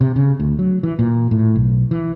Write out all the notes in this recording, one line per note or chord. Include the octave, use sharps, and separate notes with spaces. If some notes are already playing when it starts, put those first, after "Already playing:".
C3
C#3
D2
F#3
E3
A#2
A2
B1
E3